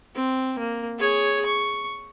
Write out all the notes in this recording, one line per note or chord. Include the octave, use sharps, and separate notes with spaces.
C4
A#3
G#4 C#5
C#6